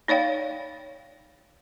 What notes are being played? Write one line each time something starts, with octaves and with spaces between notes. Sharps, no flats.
D#4 C#5 D5 F5 G5